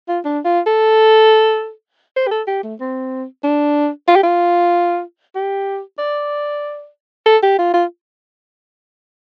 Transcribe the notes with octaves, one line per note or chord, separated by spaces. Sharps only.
F4
D4
F4
A4
C5
G4
A4
G4
A3
C4
D4
F4
G4
F4
G4
D5
A4
G4
F4
F4